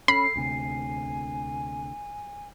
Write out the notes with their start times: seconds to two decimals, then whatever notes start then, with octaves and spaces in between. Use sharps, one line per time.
0.08 C#4 A4 B5 C7
0.36 D2 C3 G#5